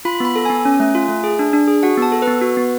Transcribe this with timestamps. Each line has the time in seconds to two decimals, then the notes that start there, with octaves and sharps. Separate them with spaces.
0.05 F4 B5
0.20 B3 B5
0.36 A4
0.45 B3 G#5
0.65 C#4
0.80 A3
0.95 F4
1.09 A3
1.24 G#4
1.39 D4
1.53 D4
1.67 G#4
1.83 F#4 F#5
1.97 B3 A5
2.12 A4
2.22 B4
2.27 B3
2.41 F#4
2.57 B3